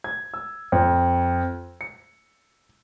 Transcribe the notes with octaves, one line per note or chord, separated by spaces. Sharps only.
G#6
E6
F2
C#7